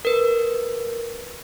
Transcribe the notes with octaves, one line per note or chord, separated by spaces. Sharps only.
A#4 B4